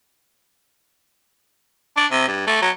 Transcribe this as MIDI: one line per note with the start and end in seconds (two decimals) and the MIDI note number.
1.97 2.06 62
2.11 2.28 48
2.28 2.47 43
2.47 2.60 57
2.62 2.70 54